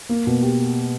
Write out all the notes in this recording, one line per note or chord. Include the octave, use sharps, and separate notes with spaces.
A#3
B2
G4